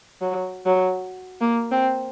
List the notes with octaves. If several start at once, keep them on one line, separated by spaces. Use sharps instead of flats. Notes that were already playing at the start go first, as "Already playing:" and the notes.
F#3
F#3
A#3
C4